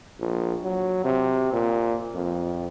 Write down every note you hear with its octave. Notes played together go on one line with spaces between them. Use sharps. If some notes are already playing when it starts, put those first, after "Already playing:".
A#1
F#3
C3
A#2
F2